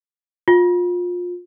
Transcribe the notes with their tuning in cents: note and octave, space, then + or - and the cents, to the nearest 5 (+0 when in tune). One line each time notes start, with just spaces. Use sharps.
F4 +25